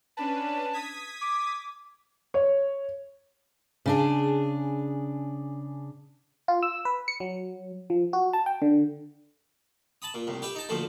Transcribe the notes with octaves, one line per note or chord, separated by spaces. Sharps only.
C#4 D4 B4 A5
D#6 G#6 B6
D6
C#5
C#3 D4 G#4
F4
E6
B4
C#7
F#3
F3
F#4
A5
G5
D3
A5 B5 D#6
A#2
C2 A2
G4 B4 E5
D#4 A5
D2 A#2 F3 A3